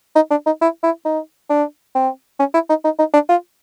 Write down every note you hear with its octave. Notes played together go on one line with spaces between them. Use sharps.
D#4
D4
D#4
E4
E4
D#4
D4
C4
C#4
E4
D#4
D#4
D#4
D4
F4